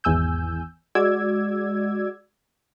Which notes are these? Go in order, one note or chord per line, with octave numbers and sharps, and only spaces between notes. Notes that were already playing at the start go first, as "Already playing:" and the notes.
G#1 E2 G#5 E6 G6
G#3 F#4 D5 D6 E6 G#6